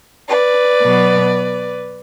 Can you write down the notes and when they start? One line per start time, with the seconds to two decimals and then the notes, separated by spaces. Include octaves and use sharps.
0.28 B4 D5
0.81 B2 F#3 B3